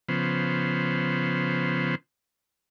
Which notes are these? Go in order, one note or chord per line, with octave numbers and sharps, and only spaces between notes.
C#3 F3 B3 C5